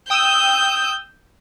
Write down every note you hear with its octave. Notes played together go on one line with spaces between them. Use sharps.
G5 D#6 E6 G6